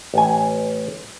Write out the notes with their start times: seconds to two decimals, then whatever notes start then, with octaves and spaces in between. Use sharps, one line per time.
0.14 A1 G#5